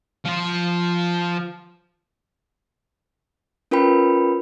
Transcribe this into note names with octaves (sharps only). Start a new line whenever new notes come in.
F3 F4
C#4 F4 A#4 B4 G5 B5